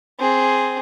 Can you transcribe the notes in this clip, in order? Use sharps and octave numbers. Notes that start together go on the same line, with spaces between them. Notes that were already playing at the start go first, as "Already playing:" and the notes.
C4 G#4